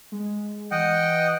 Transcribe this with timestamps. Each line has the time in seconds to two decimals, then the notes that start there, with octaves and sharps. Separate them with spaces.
0.12 G#3
0.71 E3 D#5 F#5 G5